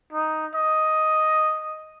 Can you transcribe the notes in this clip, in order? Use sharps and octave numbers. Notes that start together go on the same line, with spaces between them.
D#4
D#5